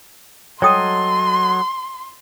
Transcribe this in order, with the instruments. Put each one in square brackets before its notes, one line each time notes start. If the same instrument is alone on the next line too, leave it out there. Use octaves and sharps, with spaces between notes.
[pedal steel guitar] F#3 A4 D#5 [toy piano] C#5 G5 D#6 [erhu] C6